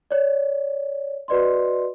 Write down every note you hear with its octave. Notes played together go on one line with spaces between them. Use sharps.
C#5 D5
F#4 B4 D5 D#5 C6